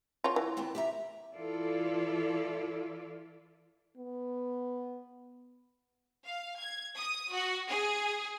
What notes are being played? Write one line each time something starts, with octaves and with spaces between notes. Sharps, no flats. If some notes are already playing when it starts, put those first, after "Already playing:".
F4 C#5
E3
D#2 B3 C4
G4 E5 A#5
E3 E4 F4 A4 D5
B3
F5
G#6
D#6
F#4
G#4